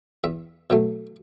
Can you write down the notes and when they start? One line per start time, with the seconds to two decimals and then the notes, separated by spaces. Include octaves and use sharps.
0.24 E2 E5
0.70 B2 F#3 A3